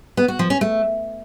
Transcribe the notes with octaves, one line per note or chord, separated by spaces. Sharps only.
B3
F#4
F3
C#4
A3